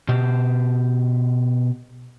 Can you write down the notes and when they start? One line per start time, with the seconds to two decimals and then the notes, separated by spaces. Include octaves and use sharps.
0.08 B2 G4